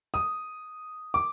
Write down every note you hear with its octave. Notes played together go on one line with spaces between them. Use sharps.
D#6
D6